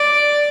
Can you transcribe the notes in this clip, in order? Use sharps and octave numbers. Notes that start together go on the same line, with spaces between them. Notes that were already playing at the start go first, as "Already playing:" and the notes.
Already playing: D5